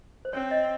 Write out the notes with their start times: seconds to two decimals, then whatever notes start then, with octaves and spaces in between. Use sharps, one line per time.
0.25 C5
0.33 C4 C#5
0.51 D#5